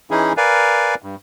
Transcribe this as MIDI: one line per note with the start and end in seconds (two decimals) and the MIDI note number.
0.11 0.33 52
0.11 0.33 61
0.11 0.33 63
0.11 0.33 64
0.11 0.33 68
0.37 0.95 70
0.37 0.95 71
0.37 0.95 74
0.37 0.95 77
0.37 0.95 80
1.02 1.15 43